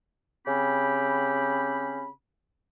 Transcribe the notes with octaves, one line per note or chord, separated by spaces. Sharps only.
C#3 C4 C#4 G4 B5